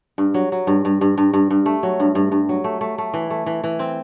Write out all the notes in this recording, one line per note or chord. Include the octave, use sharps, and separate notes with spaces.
G2
F#3
F#3
G2
G2
G2
G2
G2
G2
A3
F#3
G2
G2
G2
F#3
A3
A3
A3
E3
A3
E3
E3
C4